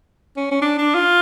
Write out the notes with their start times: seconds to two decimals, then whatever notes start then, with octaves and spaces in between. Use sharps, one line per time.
0.37 C#4
0.51 C#4
0.62 D4
0.78 D4
0.95 F4